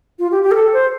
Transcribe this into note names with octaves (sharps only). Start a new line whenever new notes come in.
F4
G4
G4
A#4
A4
C5